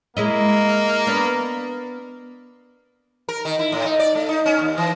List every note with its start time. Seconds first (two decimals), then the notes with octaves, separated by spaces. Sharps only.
0.17 G#3 A#3 E4 D#5
1.07 B3 D4
3.29 A#4
3.45 D#3
3.59 E4
3.72 A2
3.85 D#4
3.99 D5
4.15 A3
4.29 D#4
4.46 C#4
4.59 D#2
4.78 E3